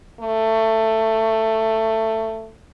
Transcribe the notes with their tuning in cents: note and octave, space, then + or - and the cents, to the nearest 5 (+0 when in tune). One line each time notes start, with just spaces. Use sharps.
A3 +15